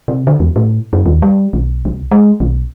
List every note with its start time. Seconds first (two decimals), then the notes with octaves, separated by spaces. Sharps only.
0.08 C3
0.27 D3
0.40 E2
0.56 A2
0.93 F#2
1.06 D#2
1.22 G3
1.53 B1
1.85 C2
2.11 G#3
2.40 B1